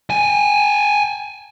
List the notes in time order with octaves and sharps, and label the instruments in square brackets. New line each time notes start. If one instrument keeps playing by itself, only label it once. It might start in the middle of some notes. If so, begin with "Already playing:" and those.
[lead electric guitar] G5 G#5